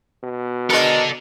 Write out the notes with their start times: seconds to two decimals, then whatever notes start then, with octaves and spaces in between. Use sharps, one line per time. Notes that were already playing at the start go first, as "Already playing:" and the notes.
0.24 B2
0.70 G#3 A4 A#4 D5